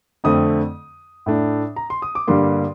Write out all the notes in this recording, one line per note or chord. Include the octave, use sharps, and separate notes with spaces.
F2 D3 A3 C4 D#6
A2 A3 D4
A#5
C6
D#6
D6
G2 D3 G3 A#3 C6